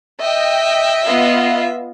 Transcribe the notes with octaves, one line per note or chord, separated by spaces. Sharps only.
D#5 E5 G5
B3 F4 D#5